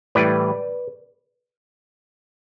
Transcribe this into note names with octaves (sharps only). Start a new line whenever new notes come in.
A2 E3 G3 B4 D5